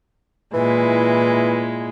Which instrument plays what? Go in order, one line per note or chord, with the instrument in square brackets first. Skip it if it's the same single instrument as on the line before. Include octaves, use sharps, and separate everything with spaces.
[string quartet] A#2 G#3 E4 [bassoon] E3